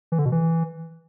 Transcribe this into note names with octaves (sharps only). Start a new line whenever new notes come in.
E3
D3
B2
E3